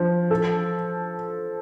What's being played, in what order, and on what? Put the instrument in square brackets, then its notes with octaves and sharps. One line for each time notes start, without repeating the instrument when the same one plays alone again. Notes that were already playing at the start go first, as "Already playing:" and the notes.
Already playing: [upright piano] F3
A4